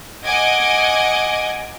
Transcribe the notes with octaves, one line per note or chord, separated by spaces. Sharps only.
D#5 F#5 G#5 D6 G#6